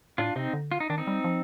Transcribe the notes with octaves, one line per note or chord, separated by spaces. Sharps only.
A2 D4 F4
C3 C4 D#4
D3
F4
D#4
D#3 D4
C4 D#4
G3
F3